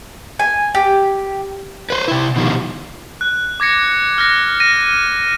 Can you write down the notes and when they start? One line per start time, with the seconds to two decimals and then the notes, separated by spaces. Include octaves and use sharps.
0.39 G#5
0.75 G4
1.90 B4 C5
2.08 C3 E4
2.36 B2 D#3 F3 G3
3.21 F#6
3.60 D6 G#6 A#6 C#7
4.18 F6 F#6 A#6
4.60 A#6 D#7